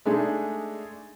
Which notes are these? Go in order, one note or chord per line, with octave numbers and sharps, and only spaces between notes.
G#3 A3 D4 D#4 G#4